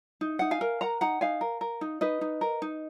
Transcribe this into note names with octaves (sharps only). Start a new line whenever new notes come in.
D#4
D#4 F#5
F5 G#5
A#4
A#4 F#5 A#5
D#4 F#5 A#5
D#4 F5 G#5
A#4
A#4
D#4
D#4 B4 D#5
D#4
A#4
D#4